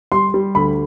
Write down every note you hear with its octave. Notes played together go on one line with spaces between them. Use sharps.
G3 C6
G3
D2 B5